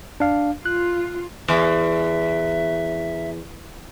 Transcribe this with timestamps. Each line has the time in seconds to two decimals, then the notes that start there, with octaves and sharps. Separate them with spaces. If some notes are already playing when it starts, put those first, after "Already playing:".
0.20 D4 F5
0.66 F4 F#6
1.48 E2 E5